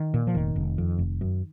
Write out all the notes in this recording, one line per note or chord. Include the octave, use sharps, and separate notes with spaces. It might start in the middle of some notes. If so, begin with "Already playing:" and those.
Already playing: D#3
A#2
F3
F1 D#3
F1
F2
F1
F#2